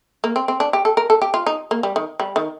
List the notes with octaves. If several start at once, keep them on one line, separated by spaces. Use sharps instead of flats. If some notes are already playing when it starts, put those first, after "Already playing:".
A#3
C4
C4
D4
G4
A4
A#4
A4
G4
F4
D#4
A#3
G3
D#3
G3
D#3